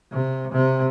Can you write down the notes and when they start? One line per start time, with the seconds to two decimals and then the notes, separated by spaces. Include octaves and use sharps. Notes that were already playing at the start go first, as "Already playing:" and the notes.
0.12 C3
0.52 C3